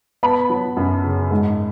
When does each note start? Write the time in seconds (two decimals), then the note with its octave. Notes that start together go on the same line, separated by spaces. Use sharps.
0.23 B3 A5 B5
0.50 F#3
0.77 F#2
1.04 C#3
1.31 G#2